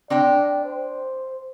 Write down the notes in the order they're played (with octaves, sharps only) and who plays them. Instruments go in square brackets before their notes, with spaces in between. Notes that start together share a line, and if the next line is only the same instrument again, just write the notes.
[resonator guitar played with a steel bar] C4 D4 G5 [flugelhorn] D5
[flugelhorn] C5